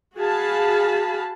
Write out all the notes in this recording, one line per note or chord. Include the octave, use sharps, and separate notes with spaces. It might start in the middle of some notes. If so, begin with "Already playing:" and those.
F#4 G#4 F5 A5 B5